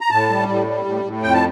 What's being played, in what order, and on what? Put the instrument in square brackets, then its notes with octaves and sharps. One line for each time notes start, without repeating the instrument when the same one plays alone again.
[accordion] A#5
A2 A5
G3
A2
G3
A2
A2
F2 G5
A5